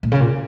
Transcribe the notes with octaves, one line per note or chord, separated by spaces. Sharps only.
A#2
C#3
A#2